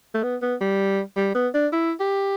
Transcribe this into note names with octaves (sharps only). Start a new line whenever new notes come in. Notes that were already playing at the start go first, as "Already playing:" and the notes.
A3
B3
B3
G3
G3
B3
D4
E4
G4